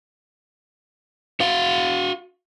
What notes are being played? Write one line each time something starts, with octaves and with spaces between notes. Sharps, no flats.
F#4 F5